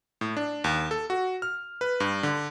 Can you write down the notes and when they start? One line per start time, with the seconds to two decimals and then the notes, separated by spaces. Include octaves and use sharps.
0.21 A2
0.37 D4
0.64 D#2
0.91 A4
1.10 F#4
1.42 F6
1.81 B4
2.00 G2
2.23 D3